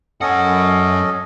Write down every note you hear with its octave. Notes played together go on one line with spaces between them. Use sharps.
F#2 C#4 A4 D#5 F#5